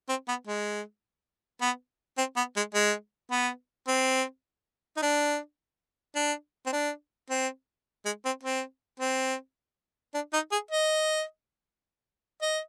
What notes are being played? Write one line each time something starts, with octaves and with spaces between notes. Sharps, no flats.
C4
B3
G#3
B3
C4
B3
G#3
G#3
B3
C4
D#4
D4
D4
C4
D4
C4
G#3
C4
C4
C4
D4
D#4
G#4
D#5
D#5